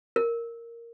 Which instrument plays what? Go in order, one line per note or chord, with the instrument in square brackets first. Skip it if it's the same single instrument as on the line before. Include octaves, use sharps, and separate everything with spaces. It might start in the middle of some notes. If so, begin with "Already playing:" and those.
[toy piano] A#4